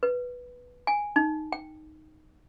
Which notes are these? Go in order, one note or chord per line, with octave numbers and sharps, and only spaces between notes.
B4
G#5
D#4
G5